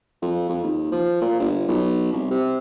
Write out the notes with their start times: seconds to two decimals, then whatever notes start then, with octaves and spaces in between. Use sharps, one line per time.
0.22 F2
0.49 F2
0.64 D#2
0.92 F3
1.22 A#2
1.40 G1
1.68 B1
2.13 C2
2.31 C3